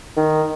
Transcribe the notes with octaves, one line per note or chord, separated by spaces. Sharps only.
D#3